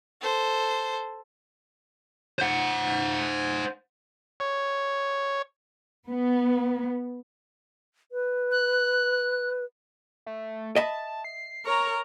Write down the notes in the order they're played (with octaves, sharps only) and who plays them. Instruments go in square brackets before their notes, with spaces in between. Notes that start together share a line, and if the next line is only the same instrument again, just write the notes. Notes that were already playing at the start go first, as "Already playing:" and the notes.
[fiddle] A4 C5
[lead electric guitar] C5 F#5
[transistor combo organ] C#5
[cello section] B3
[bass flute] B4
[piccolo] F#6
[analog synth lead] A3
[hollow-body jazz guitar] D#5 E5 B5 [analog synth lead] A5
[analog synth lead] C7
[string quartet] A#4 C#5 A#5 [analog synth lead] C#6